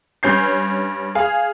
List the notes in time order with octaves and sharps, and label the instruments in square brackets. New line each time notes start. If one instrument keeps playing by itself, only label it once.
[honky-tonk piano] G2 C#4 G6 C7
G#4 F5